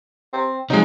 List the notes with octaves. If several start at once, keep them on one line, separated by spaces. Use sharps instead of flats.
C4
C3 F3 F#3 G#3 D#4